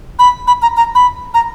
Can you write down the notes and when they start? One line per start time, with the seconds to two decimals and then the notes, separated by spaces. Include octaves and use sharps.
0.19 B5
0.47 B5
0.62 A#5
0.77 A#5
0.95 B5
1.34 A#5